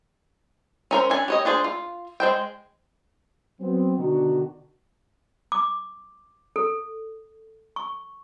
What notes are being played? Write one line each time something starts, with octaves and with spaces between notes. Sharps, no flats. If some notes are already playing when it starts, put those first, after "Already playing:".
C#4 A#4 C5
C#4 D4 G#5
G4 C#5 D#5
D4 F4 G#4 C5
F4
G#3 C5 G5
F#3 B3 C4
B2 D3 D#3 D4 F#4
D6
A4
C#6